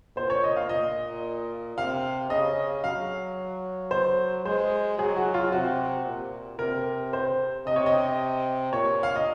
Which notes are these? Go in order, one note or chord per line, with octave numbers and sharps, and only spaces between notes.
A#2 C5
C#5
D#5
F5
A#2 D#5
C3 F5
C#3 D#5
F#3 F5
C5
G#3 C5
F#3 G#4
F#4
F4
C3 F#4
A#2
C3 A#4
C5
C3 D#5
C#5
D#5
A#2 C#5
F5
D#5